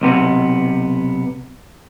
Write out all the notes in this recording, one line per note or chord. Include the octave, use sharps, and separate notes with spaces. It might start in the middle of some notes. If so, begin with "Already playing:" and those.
B1 C3 B3